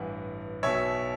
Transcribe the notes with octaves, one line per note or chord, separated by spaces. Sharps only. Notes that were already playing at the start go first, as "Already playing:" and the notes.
Already playing: A1 G2 E3 F#5
B1 B2 C#5 E5